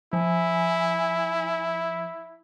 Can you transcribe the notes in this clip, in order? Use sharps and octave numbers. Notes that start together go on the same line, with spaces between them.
F3 E4 G#5